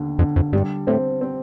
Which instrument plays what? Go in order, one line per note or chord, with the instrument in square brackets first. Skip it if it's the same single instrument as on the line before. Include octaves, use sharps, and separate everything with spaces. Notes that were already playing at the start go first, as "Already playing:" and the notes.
Already playing: [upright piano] D#2 D3
[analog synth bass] F2 [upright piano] D3
[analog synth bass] F2
[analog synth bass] G2 [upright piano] G3
[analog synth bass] A2 [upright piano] C4
[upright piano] C4